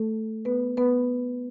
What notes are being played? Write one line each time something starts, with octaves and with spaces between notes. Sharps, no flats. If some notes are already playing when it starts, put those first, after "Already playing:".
Already playing: A3 A4
B3 B4
B3 B4